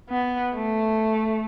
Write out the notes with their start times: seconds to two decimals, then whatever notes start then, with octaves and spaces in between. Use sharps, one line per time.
0.10 B3
0.55 A3